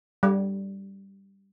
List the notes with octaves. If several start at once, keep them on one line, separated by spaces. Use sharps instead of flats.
G3